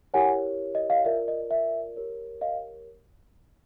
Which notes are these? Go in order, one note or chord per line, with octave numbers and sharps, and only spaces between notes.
E4 G4 A#4 C#5 F#5 G#5
D#5
D#5 F5
F4 A#4 D5 E5
D#5
E5
G4 A#4 C#5
D#5 F5